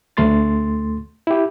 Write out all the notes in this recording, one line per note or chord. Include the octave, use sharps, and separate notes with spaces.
D2 A3 C6 A6
E4 G4